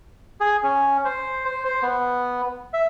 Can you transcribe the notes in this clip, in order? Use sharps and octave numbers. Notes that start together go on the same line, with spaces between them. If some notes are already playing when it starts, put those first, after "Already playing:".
G#4
C#4
C5
C5
C5
B3
E5